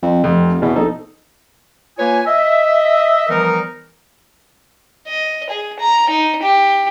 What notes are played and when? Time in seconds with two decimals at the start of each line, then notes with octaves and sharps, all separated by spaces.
0.03 F2
0.24 F1 F2
0.62 E2 B2
0.76 A#1 D#4 A4
1.99 A#3 F4 B4 C#5 G#5
2.27 D#5 E5
3.29 E3 F3 G3 B3 D#4 A#4
5.08 D#5
5.50 G#4
5.80 A#5
6.10 D#4
6.43 G4